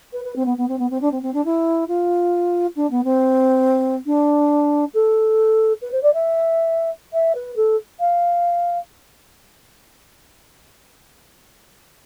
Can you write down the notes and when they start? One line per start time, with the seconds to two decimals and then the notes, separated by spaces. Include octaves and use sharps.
0.13 B4
0.25 B4
0.36 C4
0.46 B3
0.58 B3
0.69 C4
0.79 B3
0.90 C4
1.01 D4
1.12 C4
1.23 C4
1.34 D4
1.45 E4
1.88 F4
2.76 D4
2.91 B3
3.04 C4
4.06 D4
4.94 A4
5.82 B4
5.92 C5
6.03 D5
6.14 E5
7.13 E5
7.35 B4
7.56 A4
8.00 F5